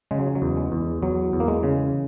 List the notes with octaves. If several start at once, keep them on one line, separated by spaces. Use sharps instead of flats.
C#3 G#3
F#3
F#3
E2
G#3
E2
E2 F#3
E2
A#3
G#3
C#3